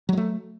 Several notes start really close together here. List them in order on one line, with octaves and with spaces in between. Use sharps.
F#3 G#3 A3